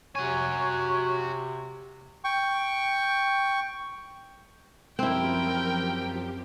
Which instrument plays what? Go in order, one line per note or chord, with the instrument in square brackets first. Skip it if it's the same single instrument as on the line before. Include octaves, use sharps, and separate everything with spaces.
[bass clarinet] C3 [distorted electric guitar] F#4 G#5 [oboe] C#5
[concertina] G5 C#6
[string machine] F#2 F3 G4 [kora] C4 E4 [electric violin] A#4 G5